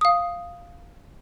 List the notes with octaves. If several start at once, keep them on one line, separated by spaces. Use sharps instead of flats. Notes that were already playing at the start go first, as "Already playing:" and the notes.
F5 D#6